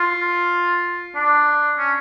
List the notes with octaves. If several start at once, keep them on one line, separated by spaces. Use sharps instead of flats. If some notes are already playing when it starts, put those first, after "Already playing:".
Already playing: F4
D4
C#4